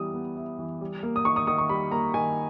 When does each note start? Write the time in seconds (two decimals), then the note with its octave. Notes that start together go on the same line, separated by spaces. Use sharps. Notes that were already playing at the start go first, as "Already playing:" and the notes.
Already playing: E3 G3 B3 E4 D#6
0.14 B3
0.36 E4
0.59 E3
0.81 G3
1.03 A#3
1.16 D#6
1.25 D#3 C#6
1.36 D#6
1.47 D#3 D#6
1.58 C#6
1.69 G3 B5
1.92 A#3 A#5
2.14 D#3 G#5